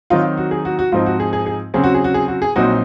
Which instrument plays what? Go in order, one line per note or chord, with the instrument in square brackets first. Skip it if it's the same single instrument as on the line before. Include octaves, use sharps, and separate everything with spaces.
[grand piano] D#3 F#3 C4 D#4 [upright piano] F4
[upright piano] F#4
G#4
F#4
F#4
[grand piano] G#2 F3 C4 D#4 [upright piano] F4
[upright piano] F#4
G#4
G#4
G#4
[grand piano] C#3 F#3 C4 [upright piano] G#4
[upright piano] F#4
G#4
F#4
G#4
F#4
G#4
[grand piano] A#1 A#2 F#3 C4 D#4 [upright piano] F#4